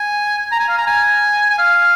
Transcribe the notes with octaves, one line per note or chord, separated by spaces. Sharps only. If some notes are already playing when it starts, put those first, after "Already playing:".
Already playing: G#5
A#5
G#5
F5
A#5
G#5
G#5
F5